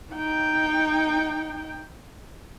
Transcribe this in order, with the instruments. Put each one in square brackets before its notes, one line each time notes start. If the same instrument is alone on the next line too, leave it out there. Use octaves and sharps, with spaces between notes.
[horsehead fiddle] D#4 G5